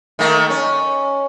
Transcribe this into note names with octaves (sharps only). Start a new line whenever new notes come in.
D#3 A3 A#3
C#4